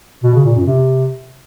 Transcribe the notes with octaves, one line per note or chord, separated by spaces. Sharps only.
B2
C#3
A#2
F#2
C3